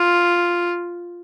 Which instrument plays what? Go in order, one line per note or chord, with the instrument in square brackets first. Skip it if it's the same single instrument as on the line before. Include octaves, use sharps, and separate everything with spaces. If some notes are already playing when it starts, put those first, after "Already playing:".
Already playing: [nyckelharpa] F4